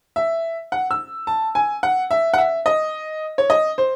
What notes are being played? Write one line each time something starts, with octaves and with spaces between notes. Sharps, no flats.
E5
F#5
E6
A5
G#5
F#5
E5
F#5
E5
D#5
C#5
D#5
C5